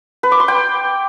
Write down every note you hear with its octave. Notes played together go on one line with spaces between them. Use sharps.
B4
D6
C6
G5